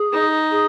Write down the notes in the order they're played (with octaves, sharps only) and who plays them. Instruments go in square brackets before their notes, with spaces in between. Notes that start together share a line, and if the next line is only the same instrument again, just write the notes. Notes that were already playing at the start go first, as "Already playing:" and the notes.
Already playing: [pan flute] G#4
[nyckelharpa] D#4
[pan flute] G#4